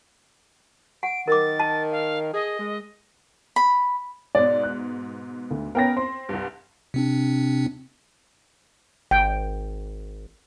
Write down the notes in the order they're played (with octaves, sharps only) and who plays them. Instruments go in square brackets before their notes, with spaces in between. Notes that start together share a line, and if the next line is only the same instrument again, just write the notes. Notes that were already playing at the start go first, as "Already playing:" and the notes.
[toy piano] F#5 [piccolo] D7
[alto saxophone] D#3 [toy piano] A#4 D6 [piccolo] A6
[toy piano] A5
[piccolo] F5
[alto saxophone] G#4 [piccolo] D#5
[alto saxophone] G#3
[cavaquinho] B5
[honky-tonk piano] G#2 B2 [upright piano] D5
[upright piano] F#6
D2
[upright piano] B3 G5 A#6 [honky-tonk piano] C#4 A#4
[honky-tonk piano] C4 [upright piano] C6
[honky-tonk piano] C2 G2
[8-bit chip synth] C3 C4 D4
[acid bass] G#1 [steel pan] G5